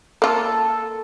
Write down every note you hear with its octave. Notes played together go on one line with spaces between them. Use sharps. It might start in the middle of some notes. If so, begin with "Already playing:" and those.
A#3 F4 A4